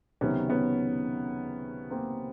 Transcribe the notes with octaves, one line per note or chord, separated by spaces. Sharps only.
C#2 C3 D#3 F#3 B3 C#4
B3 C#4
A#3 C4